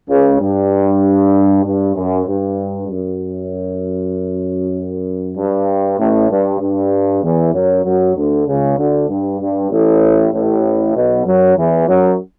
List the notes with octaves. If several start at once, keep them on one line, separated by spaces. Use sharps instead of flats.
C#2 C#3
G2
G2
F#2
G2
F#2
G2
A1 A2
G2
G2
E2 E3
F#2 F#3
F#2 F#3
D2 D3
C#2 C#3
D2 D3
G2
G2
A1 A2
A1 A2
B1 B2
F#2 F#3
E2 E3
F#2 F#3